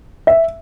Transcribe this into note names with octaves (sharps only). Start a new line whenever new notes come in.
E5